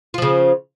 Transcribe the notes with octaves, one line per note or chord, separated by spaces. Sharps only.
C#3 F3 F4